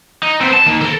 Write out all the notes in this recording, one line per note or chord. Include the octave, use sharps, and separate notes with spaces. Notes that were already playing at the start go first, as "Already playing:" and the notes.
D#4
B3 C4
A5
D#3 A#3
A4 A#4